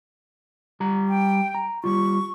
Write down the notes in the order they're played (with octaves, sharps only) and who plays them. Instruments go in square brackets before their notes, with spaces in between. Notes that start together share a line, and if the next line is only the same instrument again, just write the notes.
[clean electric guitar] G3 A#5
[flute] G5
[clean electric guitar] A#5
[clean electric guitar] G3 F4 [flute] C#6